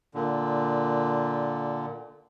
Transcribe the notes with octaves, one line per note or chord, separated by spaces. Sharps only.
A#2 D3